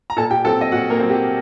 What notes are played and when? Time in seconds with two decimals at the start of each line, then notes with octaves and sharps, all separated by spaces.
0.10 A#5
0.17 A#2 A4 A5
0.31 G4 G5
0.44 F#3 C4 A4 A5
0.61 D#5
0.72 A#2 F#4 F#5
0.90 A#3 A#4
1.00 F#3 C4
1.10 G4